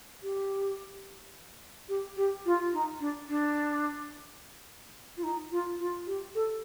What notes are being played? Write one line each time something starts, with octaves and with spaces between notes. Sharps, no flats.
G4
G4
G4
F4
D#4
D4
D4
F4
D#4
F4
F4
G4
A4